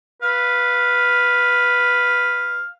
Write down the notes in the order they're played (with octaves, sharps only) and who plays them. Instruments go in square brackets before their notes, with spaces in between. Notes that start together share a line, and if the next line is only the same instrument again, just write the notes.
[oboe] B4 [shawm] F5